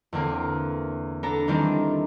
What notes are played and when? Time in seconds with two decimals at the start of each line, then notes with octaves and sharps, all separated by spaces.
0.13 E2 D3 A#3 C4
1.23 B3 D4 A4 A#5
1.48 D#3 E3 G3 C4 D4 E4